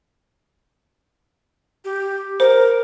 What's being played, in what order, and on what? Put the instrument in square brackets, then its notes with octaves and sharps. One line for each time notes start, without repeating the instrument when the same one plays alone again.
[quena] G4
[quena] A#4 [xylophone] C5